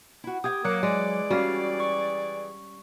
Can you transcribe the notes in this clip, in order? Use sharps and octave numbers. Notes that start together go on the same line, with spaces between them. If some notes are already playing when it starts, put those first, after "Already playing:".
E4 F#4
G4 F5 G5 D#6 G#6
F#3 A#3 D6 F#6 C#7
E3 G#3 G#4 D5
G3 C#4 F#4 F5 F6 C7
C#6